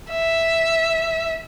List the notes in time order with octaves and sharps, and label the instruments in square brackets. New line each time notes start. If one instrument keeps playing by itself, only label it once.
[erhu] E5